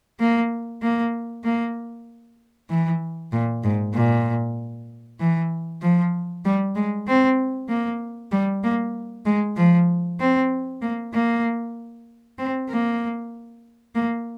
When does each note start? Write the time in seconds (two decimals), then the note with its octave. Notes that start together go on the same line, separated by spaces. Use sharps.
0.20 A#3
0.82 A#3
1.44 A#3
2.69 E3
3.32 A#2
3.64 G#2
3.94 A#2
5.20 E3
5.82 F3
6.45 G3
6.75 G#3
7.07 C4
7.69 A#3
8.32 G3
8.63 A#3
9.26 G#3
9.57 F3
10.20 C4
10.82 A#3
11.14 A#3
12.39 C4
12.69 A#3
13.95 A#3